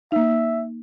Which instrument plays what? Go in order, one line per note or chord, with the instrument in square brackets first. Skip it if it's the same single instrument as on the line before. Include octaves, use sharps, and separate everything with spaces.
[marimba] A#3 D#4 [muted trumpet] E5